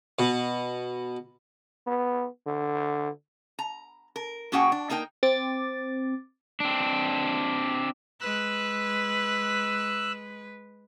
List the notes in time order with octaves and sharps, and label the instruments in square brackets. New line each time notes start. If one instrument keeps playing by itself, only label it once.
[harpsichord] B2
[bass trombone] B3
D3
[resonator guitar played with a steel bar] A#5
A#4
A#2 C#4 F#4 G#4 F#5 G5
D4
A#3 D#4 A#4 D#5 G5
[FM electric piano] C4 D6 A6
[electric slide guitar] C4 D4
[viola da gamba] G#3 B4 [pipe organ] E6 F#6